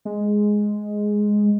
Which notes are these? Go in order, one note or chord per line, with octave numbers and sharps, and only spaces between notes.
G#3